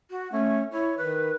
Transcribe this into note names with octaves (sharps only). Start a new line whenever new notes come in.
F#4
A3 C#4
E4 C#5
D#3 B4